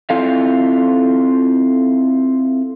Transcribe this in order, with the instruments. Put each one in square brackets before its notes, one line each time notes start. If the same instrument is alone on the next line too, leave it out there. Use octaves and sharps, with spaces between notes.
[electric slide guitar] C4 E4 F4 A4 F5